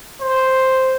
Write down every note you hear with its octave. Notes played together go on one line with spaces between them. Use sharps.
C5